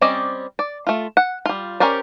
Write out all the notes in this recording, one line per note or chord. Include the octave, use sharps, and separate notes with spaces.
G3 C4 C#4 D5 D#5
D5
A3 F4
F#5
G3 F4
C#4 G4 A#4 C5 D5